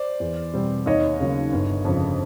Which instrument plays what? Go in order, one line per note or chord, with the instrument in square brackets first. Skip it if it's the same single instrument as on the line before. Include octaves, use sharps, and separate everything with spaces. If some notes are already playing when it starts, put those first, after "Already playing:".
Already playing: [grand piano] C5 D5
[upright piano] E2
B2 G3 C4
[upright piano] D#2 [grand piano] C#5 D#5
[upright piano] C#3 F#3 A#3
G1
F2 C#3